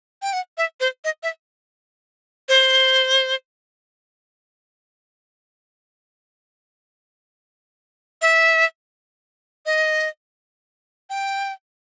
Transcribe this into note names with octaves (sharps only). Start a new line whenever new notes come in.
G5
F#5
E5
C5
D#5
E5
C5
E5
D#5
G5